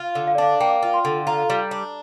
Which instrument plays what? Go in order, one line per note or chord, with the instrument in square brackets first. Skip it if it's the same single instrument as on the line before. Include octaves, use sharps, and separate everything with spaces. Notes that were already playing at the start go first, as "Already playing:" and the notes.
Already playing: [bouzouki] F4
D3
[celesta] F5
D5
[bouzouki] D4 [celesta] F5
[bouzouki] A#3 [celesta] G5
[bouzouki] F4
[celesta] C6
[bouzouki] D3
[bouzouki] F4 [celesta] A#5
[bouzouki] G3
D4